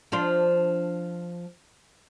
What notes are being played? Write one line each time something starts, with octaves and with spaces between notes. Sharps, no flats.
F3 D4 F4